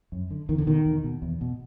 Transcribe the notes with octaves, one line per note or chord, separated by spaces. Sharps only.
F#2
D3
E2 D#3
D3
B2 D#3
E2
B2
E2
B2